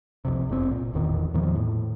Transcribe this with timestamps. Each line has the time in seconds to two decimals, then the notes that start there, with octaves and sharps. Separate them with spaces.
0.25 C2 F2 C3
0.49 F#1 C2 C3 C4
0.71 A#2
0.93 E1 A1 E2 D#3
1.34 E2 A#2 D#3 F3
1.55 A2